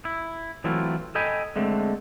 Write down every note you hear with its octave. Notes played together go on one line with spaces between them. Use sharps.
E4
E3 F#3 A3 C4 E4 F4
A4 D#5 G5 G#5 B5
D3 G#3 A3 C4